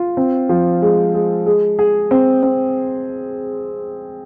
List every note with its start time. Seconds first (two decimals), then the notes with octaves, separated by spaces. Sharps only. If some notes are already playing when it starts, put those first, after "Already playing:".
Already playing: F4
0.17 C4
0.49 F3
0.82 G#3
1.14 G#3
1.46 G#3
1.79 G#4
2.11 C4
2.43 C4